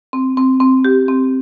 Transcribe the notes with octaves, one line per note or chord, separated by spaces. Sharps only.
C4
C4
C4
G4
C4